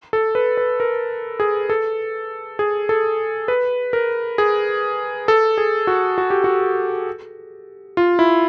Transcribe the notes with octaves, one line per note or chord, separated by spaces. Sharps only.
A4
B4
B4
A#4
G#4
A4
G#4
A4
B4
A#4
G#4
A4
G#4
F#4
F#4
G4
F#4
F4
E4